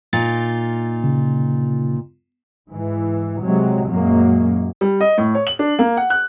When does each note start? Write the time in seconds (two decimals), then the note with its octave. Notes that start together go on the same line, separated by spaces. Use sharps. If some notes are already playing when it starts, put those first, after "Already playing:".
0.13 A#2 D#4 F4 A6
1.04 C#3
2.70 G#2 E3
3.42 C3 F#3 G#3 C4
3.88 F#2 A#2 F#3 G#3 A#3
4.81 G3
5.01 D#5
5.18 A2
5.35 C#5
5.47 F#7
5.59 D4
5.79 A#3
5.97 F#5
6.10 F#6